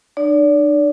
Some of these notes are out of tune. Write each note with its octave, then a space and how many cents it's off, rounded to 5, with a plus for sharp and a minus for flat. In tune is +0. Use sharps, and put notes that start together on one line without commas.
D4 +40 D5 -35